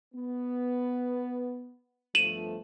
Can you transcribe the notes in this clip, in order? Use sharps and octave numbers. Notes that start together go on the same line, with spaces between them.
B3
G1 F3 A3 D#7 E7 F#7